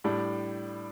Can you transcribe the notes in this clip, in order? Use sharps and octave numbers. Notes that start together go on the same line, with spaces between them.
A2 G3 D4